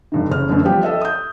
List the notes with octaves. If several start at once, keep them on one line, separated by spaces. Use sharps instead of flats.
F1 G2 D#3
F#1 C#4 F6
F#2 D3 A3 B3
F3 G3 B3 G4 G5
A4 D#5 E5
D#6 G6